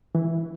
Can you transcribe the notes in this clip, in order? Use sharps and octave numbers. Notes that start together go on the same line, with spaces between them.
E3